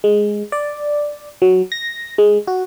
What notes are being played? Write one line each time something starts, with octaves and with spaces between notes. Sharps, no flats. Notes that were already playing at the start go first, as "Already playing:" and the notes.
G#3
D5
F#3
A#6
G#3
F#4